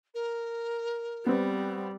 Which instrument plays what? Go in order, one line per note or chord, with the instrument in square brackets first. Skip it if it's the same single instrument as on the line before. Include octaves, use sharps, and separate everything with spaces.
[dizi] A#4
[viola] G3 [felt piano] B3 C4